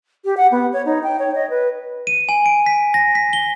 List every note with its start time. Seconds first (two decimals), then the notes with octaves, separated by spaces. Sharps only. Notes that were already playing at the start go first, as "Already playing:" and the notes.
0.25 G4
0.37 F#5
0.52 B3
0.73 C#5
0.86 D#4
1.03 G5
1.19 C#5
1.35 D#5
1.50 B4
2.07 D#7
2.29 G#5
2.46 D7
2.66 B6
2.94 A#6
3.15 B6
3.33 G7